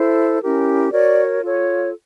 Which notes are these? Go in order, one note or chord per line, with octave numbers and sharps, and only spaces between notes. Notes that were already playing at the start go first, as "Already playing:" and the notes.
Already playing: E4 A4 C5
C#4 E4 G4 A#4
F#4 A#4 C#5 D5
F4 A4 C#5